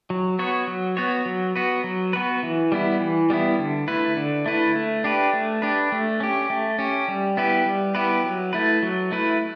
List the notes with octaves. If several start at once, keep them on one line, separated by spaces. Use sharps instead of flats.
F#3
B3 F#4 C#5
F#3
B3 F#4 C#5
F#3
B3 F#4 B4
F#3
B3 F#4 B4
E3
G3 B3 E4
E3
G3 B3 E4
D3
A3 E4 B4
D3
A3 E4 B4
A3
D4 G4 B4
A3
D4 G4 B4
A3
C#4 G4
A3
C#4 G4
G3
B3 E4 G4 B4
G3
B3 E4 G4 B4
F#3
A3 E4 B4
F#3
A3 E4 B4